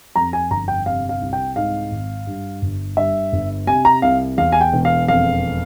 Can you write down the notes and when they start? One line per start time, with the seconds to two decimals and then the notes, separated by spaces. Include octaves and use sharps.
0.16 F2 A#5
0.33 G#5
0.51 G1 A#5
0.68 G5
0.86 C3 F5
1.09 F5
1.21 C2
1.33 G5
1.56 G#2 F5
1.91 G#1
2.27 G2
2.62 G1
2.97 G2 E5
3.32 G1
3.67 C3 G#5
3.85 A#5
4.02 C2 F5
4.38 E2 F5
4.52 G#5
4.61 G5
4.73 E1
4.85 F5
5.08 F2 F5